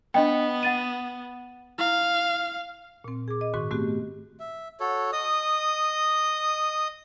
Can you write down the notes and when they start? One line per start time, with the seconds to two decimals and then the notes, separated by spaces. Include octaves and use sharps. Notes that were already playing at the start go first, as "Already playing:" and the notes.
0.14 B3 D4 D#5 G5
0.63 F#5 A6 D#7
1.78 E4 F5
3.04 A#2 C4
3.28 G#4 D6
3.41 D#5
3.54 G#2 D#3 F#4 C6 C#6
3.71 A3 B3 C4 F#4 G4
4.40 E5
4.80 F#4 A4 C#5
5.13 D#5 D#6